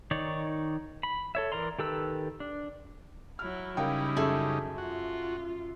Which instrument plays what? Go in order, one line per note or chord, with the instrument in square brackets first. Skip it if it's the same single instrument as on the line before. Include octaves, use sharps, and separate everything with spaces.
[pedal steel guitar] D#3 D#4 C#5 D5
B5
A4 C#5 E5
E3 A#4 D5 A#5 C6
D#3 G4 A4 B4 E6
D4
[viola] F#3 E4 [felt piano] F6
[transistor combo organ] C#3 G3 D#4 [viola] E4 [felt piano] A#4 F5 G5
[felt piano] F#2 E5 C#6 [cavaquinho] G#4 A4
[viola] F4 [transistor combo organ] F#4